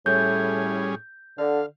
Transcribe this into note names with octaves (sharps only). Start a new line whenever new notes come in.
A2 G3 C#4 G#4 G6
D3 F5